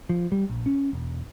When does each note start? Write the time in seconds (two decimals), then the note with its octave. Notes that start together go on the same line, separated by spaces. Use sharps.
0.10 F3
0.32 G3
0.49 A#1
0.66 C#4
0.93 E1